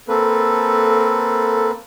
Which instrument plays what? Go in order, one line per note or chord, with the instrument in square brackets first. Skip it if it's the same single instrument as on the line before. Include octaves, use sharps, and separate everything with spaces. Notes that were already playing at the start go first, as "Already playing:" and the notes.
[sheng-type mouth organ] A#3 C4 B4 [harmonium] A4